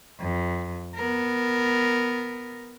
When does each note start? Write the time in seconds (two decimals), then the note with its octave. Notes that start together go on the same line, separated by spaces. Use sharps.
0.19 F2
0.95 B3 A#4